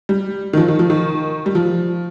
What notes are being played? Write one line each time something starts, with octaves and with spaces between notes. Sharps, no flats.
G3
D#3
F3
D#3
F3
D#3
G3
F3